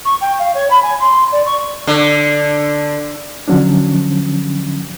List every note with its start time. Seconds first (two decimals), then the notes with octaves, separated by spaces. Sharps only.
0.05 C#6
0.21 G5
0.39 F5
0.54 C#5
0.70 B5
0.83 G#5
1.00 C6
1.32 D5
1.46 C#6
1.87 D3
3.48 D3 F3 F#3 C#4 D4